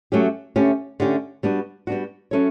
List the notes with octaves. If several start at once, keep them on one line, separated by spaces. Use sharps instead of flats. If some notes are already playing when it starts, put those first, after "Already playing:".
F#3 A3 C#4 G4
D3 A3 C#4 G4
D3 A3 C#4 G4
G3 B3 D4 F#4
G3 B3 D4 F#4
F#3 C#4 E4 A4 C#5